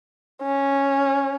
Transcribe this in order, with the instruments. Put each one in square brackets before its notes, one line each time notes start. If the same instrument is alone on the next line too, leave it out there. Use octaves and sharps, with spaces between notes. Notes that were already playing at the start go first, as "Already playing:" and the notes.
[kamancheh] C#4